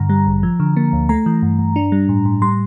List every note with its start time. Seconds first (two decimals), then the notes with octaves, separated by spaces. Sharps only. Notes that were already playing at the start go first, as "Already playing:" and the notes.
Already playing: G2 D3 A#5
0.09 G3
0.26 A1
0.43 F3
0.60 D3
0.76 A#3
0.93 D2
1.09 A3 A#5
1.26 E3
1.42 G2
1.59 G2
1.76 D4
1.92 G3
2.09 A2
2.25 A2
2.42 G3 C6